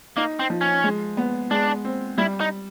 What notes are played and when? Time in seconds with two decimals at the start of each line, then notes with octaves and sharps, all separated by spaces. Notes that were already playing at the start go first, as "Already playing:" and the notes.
0.17 A#3 D#4
0.39 C4
0.50 F3
0.61 C#4
0.84 G#3
1.17 B3
1.51 G#3 D4
1.85 C4
2.18 G3 E4
2.40 D#4